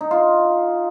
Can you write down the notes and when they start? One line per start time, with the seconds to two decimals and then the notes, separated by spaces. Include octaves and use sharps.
0.01 D#4
0.11 F4